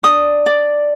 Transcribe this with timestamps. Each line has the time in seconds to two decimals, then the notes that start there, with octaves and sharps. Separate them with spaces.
0.03 D4 D#6
0.46 D5